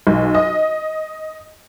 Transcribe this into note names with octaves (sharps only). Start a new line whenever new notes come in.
B1
D#5